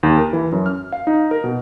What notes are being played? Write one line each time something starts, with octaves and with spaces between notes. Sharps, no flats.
D#2
A#4
E3
F#2
F6
F5
D#4
A#4
B2